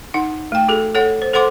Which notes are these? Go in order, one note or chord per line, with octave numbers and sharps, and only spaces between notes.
D#4 F#5
A3 G5
F#4 G#4 A4
A4 C#5 F#5
C5
A4 C5 F#5 C6 D6